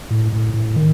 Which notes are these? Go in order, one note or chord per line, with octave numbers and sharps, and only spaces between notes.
A2
A2
A2
D#3